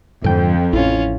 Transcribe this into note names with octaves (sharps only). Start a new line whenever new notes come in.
F2 G#2 D3 A4 G5
A1 C#4 E4 F4